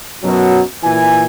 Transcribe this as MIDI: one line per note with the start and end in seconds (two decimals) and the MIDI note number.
0.23 0.60 42
0.23 0.60 47
0.23 0.60 54
0.84 1.24 46
0.84 1.24 52
0.84 1.24 80